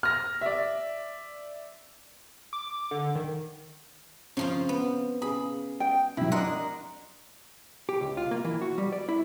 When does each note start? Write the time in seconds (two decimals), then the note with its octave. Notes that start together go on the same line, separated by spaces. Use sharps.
0.03 F6 A#6
0.41 D5 E5
2.53 D6
2.91 D3
3.15 D#3
4.37 C#3 F3 C4 F4
4.69 B3
5.22 C#3 G#4 B5 D#6
5.80 G5
6.17 C3 F#3 E4
6.32 D4 A#4 D#5 F#5 C6
7.89 G4
8.01 C#2
8.17 F4
8.31 A#3
8.45 E3
8.62 F#4
8.78 G3
8.92 D5
9.09 E4